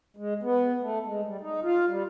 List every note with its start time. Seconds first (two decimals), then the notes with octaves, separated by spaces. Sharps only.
0.17 G#3
0.43 B3
0.81 A3
1.06 G#3
1.24 G3
1.41 D#4
1.63 F4
1.88 G3